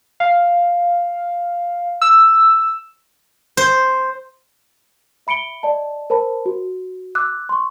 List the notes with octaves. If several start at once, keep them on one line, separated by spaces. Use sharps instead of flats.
F5
E6
C5
E5 B5 C#7 D7 G7
D5 D#5 A5
A#4 C5 A5 B5
F#4
D6 E6 F#6
C6 C#6